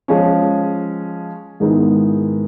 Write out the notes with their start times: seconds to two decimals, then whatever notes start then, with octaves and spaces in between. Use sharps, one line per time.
0.08 F3 G#3 C#4
1.60 G#2 D#3 G#3 B3 E4